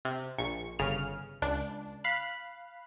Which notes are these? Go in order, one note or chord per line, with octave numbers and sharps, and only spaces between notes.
C3
A#1 C#6
G1 C#3 F6
C#2 D4
F5 B5 F#6